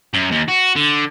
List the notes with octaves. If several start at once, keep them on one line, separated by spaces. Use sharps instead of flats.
F#2
D#2
F#4
D3